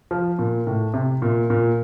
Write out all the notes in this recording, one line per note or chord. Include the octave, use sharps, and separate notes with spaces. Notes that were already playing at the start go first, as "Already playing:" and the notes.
F3
A#2
A2
C3
A#2
A#2